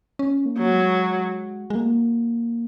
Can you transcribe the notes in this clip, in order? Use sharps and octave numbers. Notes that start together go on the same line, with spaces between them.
C#4
A#3
F#3
G#3
G#3
A#3